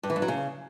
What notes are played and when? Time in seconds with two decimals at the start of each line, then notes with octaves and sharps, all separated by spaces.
0.03 G2
0.10 E3
0.16 G2
0.22 F#3
0.28 C#3